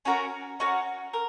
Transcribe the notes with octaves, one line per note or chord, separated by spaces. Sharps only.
C#4 F#4 A#4
C#4 F#4 A#4
A#4